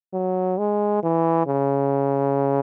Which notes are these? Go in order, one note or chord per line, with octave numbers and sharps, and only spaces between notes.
F#3
G#3
E3
C#3